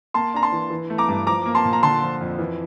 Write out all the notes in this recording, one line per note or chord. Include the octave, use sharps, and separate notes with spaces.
A#3 A5 C6
D4 A#5
A5 C6
E3
E3
A3
A#5 D6
G2
F3 A#5 D6
A#3
A5 C6
A#2
A#5
D3 A5 C6
F3
F2
E3